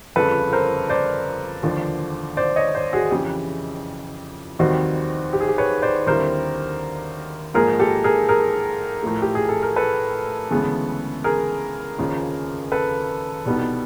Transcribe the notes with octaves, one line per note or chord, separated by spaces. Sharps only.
G1 F2 C#3 A4 B4
A#4 C5
C5 D5
E1 D#2 D3 F3
C5 D5
C#5 D#5
C5 D5
F#4 G#4
F2 C#3 E3 G4
F1 D#2 D#3 G3 C4 F#4
G4
G#4
G4
B4 C#5
C5 D5
D#2 D3 G3 C4 E4 A#4 C5
G#2 F3 A#3 G#4 A#4
G4 A4
G#4 A#4
G#4 A#4
A2 F3 A3
G4
G#4
A4
A#4
A4 B4
D2 C#3 E3 G#3 B3
G#4 A#4
F1 D#2 C#3 F3
A4 B4
C2 B2 G3 B3 D#4